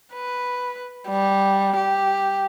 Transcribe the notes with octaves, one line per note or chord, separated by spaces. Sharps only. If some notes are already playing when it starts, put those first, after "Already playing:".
B4
G3
G4